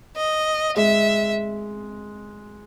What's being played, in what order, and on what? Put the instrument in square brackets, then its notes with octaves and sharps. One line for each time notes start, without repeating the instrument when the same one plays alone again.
[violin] D#5
[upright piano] G#3 [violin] E5